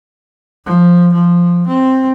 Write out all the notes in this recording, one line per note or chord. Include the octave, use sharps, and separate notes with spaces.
F3
F3
C4